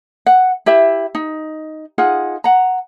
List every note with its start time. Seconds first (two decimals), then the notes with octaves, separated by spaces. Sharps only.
0.26 F#5
0.66 E4 G4 E5
1.15 D#4
1.98 D#4 F4 G#4 F#5
2.44 F#5 A#5